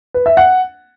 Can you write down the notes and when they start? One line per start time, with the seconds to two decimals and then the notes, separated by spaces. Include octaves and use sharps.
0.14 B4
0.26 E5
0.37 F#5